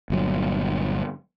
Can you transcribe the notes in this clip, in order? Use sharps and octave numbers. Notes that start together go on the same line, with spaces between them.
G1 A#2 F#3